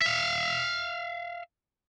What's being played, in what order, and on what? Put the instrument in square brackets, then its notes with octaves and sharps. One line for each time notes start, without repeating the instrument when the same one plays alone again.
[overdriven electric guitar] E5 F5